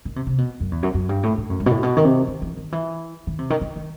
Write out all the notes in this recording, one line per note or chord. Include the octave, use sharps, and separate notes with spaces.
D#3
C3
C3
B2
F#2
E2
F#2
F#2
G2
A2
A2
F#2
G2
B2
A2
B2
D#3
C3
D#3
E3
D#3
E3
D#3
C3
D#3
D#3
D#3